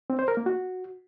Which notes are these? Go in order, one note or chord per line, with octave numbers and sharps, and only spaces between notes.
C4
C5
A#4
A#3
F#4